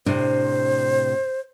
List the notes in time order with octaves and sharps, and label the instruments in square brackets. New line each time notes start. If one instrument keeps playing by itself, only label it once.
[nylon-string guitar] A2 C3 D4 [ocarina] C5